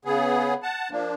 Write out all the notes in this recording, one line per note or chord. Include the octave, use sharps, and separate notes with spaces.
C#3 B3 G#4
F#5 A5
F3 A#3 D4